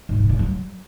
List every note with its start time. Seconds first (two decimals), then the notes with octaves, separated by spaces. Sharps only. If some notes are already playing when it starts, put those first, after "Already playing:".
0.09 G#2
0.19 C#3
0.29 C#3
0.39 F#3